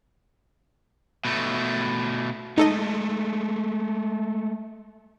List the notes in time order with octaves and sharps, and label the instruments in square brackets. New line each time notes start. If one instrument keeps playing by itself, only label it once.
[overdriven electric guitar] B2 A3
[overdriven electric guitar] G#3 A3 [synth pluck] D#4 A4 D#5